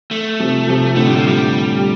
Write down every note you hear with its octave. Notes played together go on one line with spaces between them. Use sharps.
A3
C3 F3
C3 F3
A2 D3 A3
G3
F3
G3